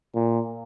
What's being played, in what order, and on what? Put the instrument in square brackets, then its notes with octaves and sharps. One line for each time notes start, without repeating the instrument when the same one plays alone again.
[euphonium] A#2